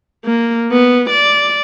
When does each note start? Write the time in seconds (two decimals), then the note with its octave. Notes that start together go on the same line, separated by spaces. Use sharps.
0.25 A#3
0.72 B3
1.10 D5